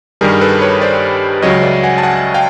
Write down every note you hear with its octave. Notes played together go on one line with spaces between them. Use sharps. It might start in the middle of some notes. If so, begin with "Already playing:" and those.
G2 D#3 G3 G#4 A#4
A4 B4
B4 C#5
C5 D5
C#2 C#3 F#3 C#5 D#5
D5 E5
F#5 G#5
A5
F#5 G#5
F5 G5